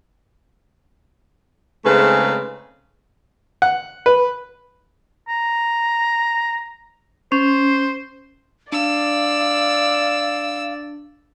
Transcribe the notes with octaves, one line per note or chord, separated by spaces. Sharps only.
C#3 G#3 A3 C4 D#4 B4
F#5
B4
A#5
C#4 C5
D4 D5 F5 E6